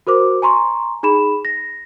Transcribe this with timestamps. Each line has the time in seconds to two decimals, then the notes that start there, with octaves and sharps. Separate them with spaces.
0.07 F#4 A#4 C5 D6
0.42 G#5 A#5 C6 C#6
1.03 D#4 G#4 B5 E7
1.45 A#6